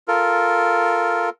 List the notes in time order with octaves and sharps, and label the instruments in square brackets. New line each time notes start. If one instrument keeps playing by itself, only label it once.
[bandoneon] F4 A4 A#4